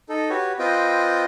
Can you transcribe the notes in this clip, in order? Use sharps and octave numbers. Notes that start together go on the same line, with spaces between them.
D#4 A4
F#4 G4 B4 C#5
C4 F4 B4 D#5 G5